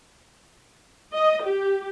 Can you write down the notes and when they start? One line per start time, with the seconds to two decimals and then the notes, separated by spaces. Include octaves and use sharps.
1.14 D#5
1.44 G4